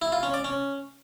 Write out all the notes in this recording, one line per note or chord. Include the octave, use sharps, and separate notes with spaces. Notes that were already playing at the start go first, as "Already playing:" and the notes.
E4
F4
C#4
D5
C#4